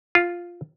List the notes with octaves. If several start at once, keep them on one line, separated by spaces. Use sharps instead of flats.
F4